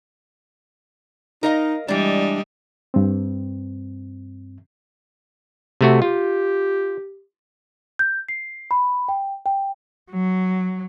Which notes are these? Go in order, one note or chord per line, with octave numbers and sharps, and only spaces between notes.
D#4 A#4 D#5 F5
E3 G3 G#3 D4 D#5
G2 C4
C3 A3 F#4
F4 G4
G6
C7
B5
G5
G5
F#3